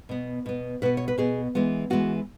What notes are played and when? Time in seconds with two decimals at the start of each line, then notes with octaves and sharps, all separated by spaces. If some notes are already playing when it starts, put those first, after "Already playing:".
0.09 B2 B3
0.46 B2 B3
0.82 B2 B3 B4
0.97 C#5
1.08 B4
1.18 B2 B3 G#4
1.55 E3 G#3 B3
1.90 E3 G#3 B3 F#4